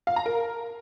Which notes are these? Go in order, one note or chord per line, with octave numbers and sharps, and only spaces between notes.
F5
A#5
A#4